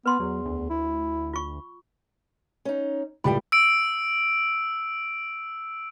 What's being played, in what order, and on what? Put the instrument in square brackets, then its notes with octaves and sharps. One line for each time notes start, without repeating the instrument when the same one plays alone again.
[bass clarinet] B3 [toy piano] B4 C6
[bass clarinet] E2 [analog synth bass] F#3
[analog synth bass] D2
[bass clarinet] E4
[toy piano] F4 C#6
[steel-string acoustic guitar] C#4 D#4
[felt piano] C#2 B5 [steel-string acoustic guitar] A2 G3 G5
[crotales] E6 D7